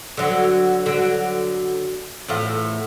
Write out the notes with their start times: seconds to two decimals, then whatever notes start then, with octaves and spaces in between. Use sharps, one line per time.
0.17 D3 F#3
0.86 D3 F#3
2.28 E2 A2 F4